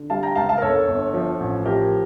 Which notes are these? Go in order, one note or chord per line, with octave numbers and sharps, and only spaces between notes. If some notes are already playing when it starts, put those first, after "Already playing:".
Already playing: D3
G3 F5 A5
G5 A#5
C#2 F5 A5
F5 A5
A#4
G1 A4 C#5
G1
F3
A1
F3 G4 A#4